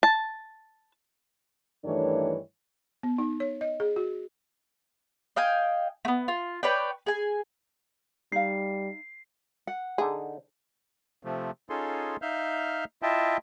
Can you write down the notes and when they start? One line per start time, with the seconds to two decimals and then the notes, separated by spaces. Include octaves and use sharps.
0.03 A5
1.84 G2 D#3 E3 A3 D4 C#5
3.03 B3
3.18 D#4
3.40 C#5
3.61 D#5
3.80 G#4
3.96 F#4
5.36 D#5 F5 G5 G#5
6.05 A3 B3
6.28 F4
6.63 B4 C#5 D5 G5
7.06 G#4 G#5
8.32 G3 D#4 F5 C7
9.67 F#5
9.98 D3 D#4 G#4
11.23 C3 F3 A3
11.70 C#4 D#4 F4 G#4 A4 C6
12.22 D#4 E5 F5 F6 G6
13.02 E4 F4 D#5 E5 G5 A5